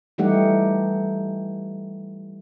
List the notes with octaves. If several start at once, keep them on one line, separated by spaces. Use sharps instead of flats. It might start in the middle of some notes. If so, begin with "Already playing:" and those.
E3 G3 A3 D#4 G4 F#5